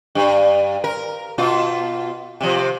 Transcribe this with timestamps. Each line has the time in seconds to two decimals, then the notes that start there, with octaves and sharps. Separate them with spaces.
0.15 G2
0.84 A#4
1.38 B2 F4
2.41 C3 F3